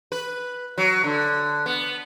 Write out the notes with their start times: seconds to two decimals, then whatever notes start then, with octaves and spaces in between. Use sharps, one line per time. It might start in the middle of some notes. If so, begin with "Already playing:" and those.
0.12 B4
0.78 F#3
1.04 D3
1.66 B3